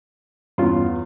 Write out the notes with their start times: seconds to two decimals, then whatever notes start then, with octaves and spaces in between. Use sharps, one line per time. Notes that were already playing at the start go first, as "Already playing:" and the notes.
0.58 E2 G2 B3 C#4 F4 C6